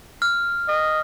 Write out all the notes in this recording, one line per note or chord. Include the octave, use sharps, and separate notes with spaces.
F6
D#5